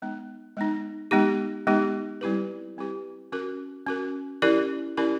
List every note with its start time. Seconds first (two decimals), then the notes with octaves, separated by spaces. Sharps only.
0.02 G#3 B3 D#4
0.57 G#3 B3 D#4
1.11 G#3 B3 D#4 G4
1.67 G#3 B3 D#4 G4
2.21 G3 C4 E4 G4 B4
2.77 G3 C4 E4 G4 B4
3.32 C#4 F#4 A#4
3.87 C#4 F#4 A#4
4.42 C#4 E4 G4 A#4 D5
4.97 C#4 E4 G4 A#4 D5